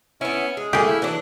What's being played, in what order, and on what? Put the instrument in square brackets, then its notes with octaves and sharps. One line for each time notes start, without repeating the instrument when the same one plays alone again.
[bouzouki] B3 E4 [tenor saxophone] C#4
[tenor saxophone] G#3 [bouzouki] G#4
[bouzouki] A3 A#3 [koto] G4 G#4
[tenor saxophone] E4
[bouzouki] E3 D4 [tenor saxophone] F#3